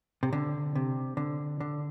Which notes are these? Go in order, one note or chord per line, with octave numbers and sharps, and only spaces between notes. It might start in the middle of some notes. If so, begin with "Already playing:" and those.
C3
D3
C3
D3
D3